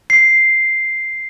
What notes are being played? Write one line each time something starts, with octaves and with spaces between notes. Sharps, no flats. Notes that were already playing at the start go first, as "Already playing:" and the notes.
C7